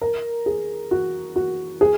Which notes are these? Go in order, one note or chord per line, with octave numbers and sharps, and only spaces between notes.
A#4
G#4
F#4
F#4
G#4